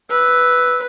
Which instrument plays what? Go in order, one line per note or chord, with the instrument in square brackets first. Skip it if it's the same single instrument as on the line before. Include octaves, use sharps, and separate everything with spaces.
[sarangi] B4 [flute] E6